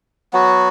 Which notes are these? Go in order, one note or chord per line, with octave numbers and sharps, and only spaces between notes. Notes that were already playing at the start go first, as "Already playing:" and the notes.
F#3 B3 F#4